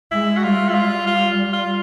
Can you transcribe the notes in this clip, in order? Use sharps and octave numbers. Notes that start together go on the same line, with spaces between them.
G#3 E4
F#4
G3 F4
E4
G3 F4
F4
F4